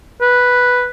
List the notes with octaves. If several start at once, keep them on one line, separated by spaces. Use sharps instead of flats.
B4